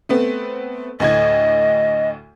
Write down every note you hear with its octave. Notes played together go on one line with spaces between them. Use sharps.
A3 B3 C4
D2 A2 D#5 G#6